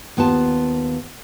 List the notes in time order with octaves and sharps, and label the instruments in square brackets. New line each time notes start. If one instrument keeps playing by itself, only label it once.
[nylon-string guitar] D#2 B3 F4 A5